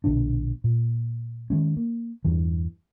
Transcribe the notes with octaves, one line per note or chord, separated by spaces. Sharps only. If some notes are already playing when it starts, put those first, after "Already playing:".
A#1 B2 D3 D4
A#2
D#3 G#3 C#4
A#3
E2 G2 E3